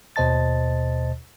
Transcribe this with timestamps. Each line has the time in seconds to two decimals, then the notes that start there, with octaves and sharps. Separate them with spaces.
0.16 D#2 B2 C5 D#5 A5 A6